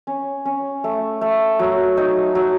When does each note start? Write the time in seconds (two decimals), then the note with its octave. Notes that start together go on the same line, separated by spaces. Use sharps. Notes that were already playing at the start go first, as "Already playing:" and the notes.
0.07 C#4
0.45 C#4
0.84 A3
1.21 A3
1.59 F#3
1.97 D#4
2.35 F#3